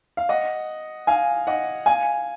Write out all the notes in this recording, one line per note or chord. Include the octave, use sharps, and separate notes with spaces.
F5
D#5 F#5
F5 G#5
D#5 F#5
F5 G#5